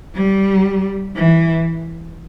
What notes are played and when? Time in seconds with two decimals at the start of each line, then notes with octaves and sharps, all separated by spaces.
0.15 G3
1.16 E3